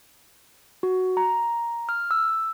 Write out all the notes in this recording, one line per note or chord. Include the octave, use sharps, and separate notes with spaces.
F#4
A#5
F6
E6